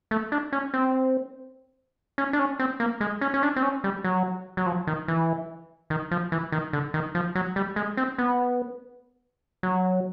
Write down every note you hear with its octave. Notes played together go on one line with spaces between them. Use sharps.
A3
D4
C#4
C4
C#4
D4
C#4
C4
A#3
G#3
C#4
C#4
D4
C4
C#4
G3
F#3
F#3
F3
D#3
E3
D#3
F3
E3
D#3
D3
D#3
F3
F#3
G3
G#3
C4
B3
F#3